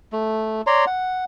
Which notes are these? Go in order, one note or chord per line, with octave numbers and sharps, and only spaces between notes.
A3
C#5 D5 A#5 C6
F#5